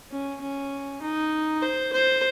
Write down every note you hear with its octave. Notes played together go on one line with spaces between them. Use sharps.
C#4
C#4
D#4
C5
C5